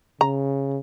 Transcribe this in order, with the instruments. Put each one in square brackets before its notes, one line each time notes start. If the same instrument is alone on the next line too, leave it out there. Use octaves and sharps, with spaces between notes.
[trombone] C#3 [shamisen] A#5